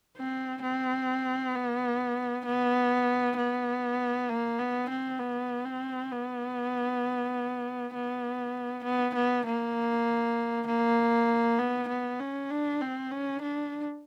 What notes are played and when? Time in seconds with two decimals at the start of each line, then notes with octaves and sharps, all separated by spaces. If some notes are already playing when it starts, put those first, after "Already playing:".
0.17 C4
0.62 C4
1.54 B3
2.46 B3
3.37 B3
4.29 A#3
4.58 B3
4.90 C4
5.19 B3
5.65 C4
6.12 B3
7.94 B3
8.84 B3
9.15 B3
9.46 A#3
10.67 A#3
11.59 B3
11.89 B3
12.20 C#4
12.51 D4
12.81 C4
13.11 C#4
13.42 D4